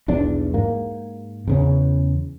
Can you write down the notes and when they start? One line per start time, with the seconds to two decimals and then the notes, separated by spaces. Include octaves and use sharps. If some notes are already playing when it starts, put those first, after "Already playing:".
0.08 B1 E2 D4
0.54 G#2 A#3
1.47 E2 C#3 C#4